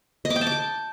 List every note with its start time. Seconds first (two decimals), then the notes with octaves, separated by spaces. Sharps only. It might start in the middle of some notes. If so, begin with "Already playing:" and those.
0.25 D#5
0.30 D6
0.36 G5
0.41 A5
0.47 D6